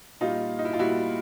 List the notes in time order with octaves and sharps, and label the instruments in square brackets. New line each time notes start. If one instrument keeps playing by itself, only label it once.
[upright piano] A#2 G3 D#4 F4
D#4
E4
F4
A#2 G3 E4 F#4